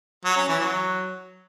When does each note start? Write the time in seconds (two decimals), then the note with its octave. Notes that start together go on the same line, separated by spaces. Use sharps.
0.25 F#3
0.37 C#4
0.48 E3
0.60 F#3